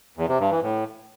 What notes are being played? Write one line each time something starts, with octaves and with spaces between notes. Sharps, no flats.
E2
C3
G2
E3
A2